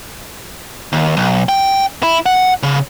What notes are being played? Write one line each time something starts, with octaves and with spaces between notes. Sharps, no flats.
D#2
B1
G5
E4
F#5
C#3